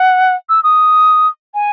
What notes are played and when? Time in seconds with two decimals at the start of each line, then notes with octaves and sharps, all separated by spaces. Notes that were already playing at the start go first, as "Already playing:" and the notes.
Already playing: F#5
0.49 E6
0.63 D#6
1.54 G#5